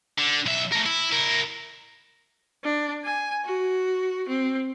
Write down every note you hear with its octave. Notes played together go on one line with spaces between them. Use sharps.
D3
B1 E5
A3 A#4
E4
E4 A#4
D4
G#5
F#4
C4